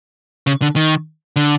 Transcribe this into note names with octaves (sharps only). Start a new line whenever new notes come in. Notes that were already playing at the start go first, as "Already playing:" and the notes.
C#3
D3
D#3
D3